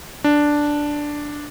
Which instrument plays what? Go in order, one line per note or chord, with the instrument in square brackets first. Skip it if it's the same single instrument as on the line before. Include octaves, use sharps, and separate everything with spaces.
[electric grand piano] D4